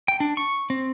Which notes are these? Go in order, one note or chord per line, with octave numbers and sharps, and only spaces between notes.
G5
D4
C#6
C4